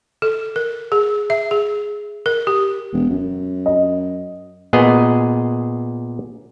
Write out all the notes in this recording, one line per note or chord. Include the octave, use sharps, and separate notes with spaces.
A4
A#4
G#4
E5
G#4
A#4
G4
E1
F#2
D#5
A#2 B3 G#4 D#5